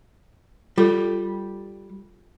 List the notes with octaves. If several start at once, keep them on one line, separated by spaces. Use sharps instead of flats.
G3 F4 A4